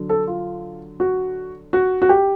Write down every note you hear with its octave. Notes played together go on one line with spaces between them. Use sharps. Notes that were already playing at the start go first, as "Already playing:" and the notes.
Already playing: D3 F#3
A4
F4
F#4
F#4
F#4
G4